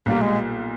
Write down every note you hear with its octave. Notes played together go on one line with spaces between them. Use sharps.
B1 A#2 G3 A#3
G#3